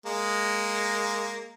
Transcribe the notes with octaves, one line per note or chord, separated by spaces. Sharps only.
G#3 A#3